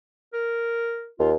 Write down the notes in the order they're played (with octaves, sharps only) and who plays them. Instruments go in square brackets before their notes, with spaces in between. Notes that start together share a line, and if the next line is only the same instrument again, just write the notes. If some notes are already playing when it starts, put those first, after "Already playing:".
[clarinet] A#4
[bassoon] D#2 [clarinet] F4